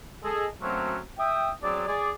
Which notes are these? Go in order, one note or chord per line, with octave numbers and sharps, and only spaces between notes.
G#4 A4 D#5
F#3 A3 A#3 C4 C#4 F#4
E5 G5 D#6
F#3 C4 G#4 D5
G#4 D5